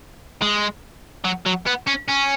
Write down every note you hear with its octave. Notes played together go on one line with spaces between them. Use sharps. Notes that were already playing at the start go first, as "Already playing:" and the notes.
G#3
F#3
F#3
B3
C#4
C#4